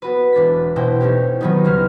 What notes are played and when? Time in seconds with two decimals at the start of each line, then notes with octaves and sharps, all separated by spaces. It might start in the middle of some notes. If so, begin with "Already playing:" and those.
0.02 B3 F#4 B4
0.33 E1 D4 A6 B6
0.76 B2 E4 F#4 C5 G5
1.00 A3 C#4 D#4 G4
1.41 D#3 F#3 B3 C#4 D#4
1.65 C#2 G3 C#4 F6 C7